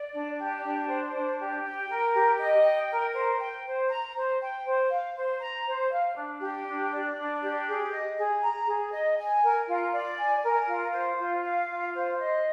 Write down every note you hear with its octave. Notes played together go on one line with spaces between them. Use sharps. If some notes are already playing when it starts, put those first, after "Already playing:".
Already playing: D5
D4
G4
D4
C5
D4
G4
G5
A#4
G4
D#5
G5
A#4
C5
G5
C5
A#5
C5
G5
C5
F5
C5
A#5
C5
F5
D4
G4
D4
D5
D4
G4
G#4
D#5
G#4
A#5
G#4
D#5
G#5
A#4
F4
D5
G#5
A#4
F4
C5
F4
F5
F4
C5
D#5